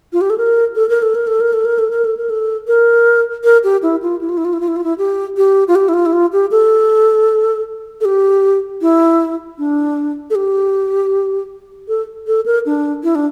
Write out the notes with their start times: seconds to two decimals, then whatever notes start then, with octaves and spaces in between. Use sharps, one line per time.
0.13 F4
0.21 G4
0.30 A4
0.38 A#4
0.76 A4
0.89 A#4
1.02 A4
1.15 A#4
1.27 A4
1.40 A#4
1.53 A4
1.65 A#4
1.78 A4
1.91 A#4
2.04 A4
2.17 A#4
2.30 A4
2.68 A#4
3.44 A#4
3.64 G4
3.83 E4
4.02 F4
4.21 E4
4.29 F4
4.37 E4
4.45 F4
4.53 E4
4.60 F4
4.68 E4
4.76 F4
4.84 E4
4.98 G4
5.37 G4
5.68 F4
5.75 G4
5.88 E4
5.94 F4
6.06 E4
6.13 F4
6.33 G4
6.51 A4
8.01 A4
8.05 G4
8.82 E4
9.58 D4
10.30 A4
10.35 G4
11.88 A4
12.27 A4
12.46 A#4
12.66 D4
13.03 E4
13.15 D4